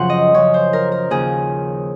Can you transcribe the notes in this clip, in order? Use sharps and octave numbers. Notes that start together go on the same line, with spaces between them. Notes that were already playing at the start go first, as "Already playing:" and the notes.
Already playing: F#2 C#3 F3 F#5 C6
D#5
F#2 C#3 F3 C#5
C5
A#4
A#4
D#2 C#3 F3 G#4